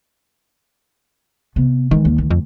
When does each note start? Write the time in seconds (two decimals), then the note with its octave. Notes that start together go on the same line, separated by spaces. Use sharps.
1.56 C3 B3
1.91 D#3 E3 G#3
2.05 D#2
2.18 D2
2.31 F2